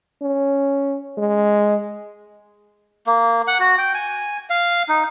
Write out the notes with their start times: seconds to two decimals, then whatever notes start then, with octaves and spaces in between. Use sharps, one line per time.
0.22 C#4
1.18 G#3
3.07 A#3
3.47 F#5
3.60 F#4
3.78 G5
3.94 G#5
4.50 F5
4.89 D#4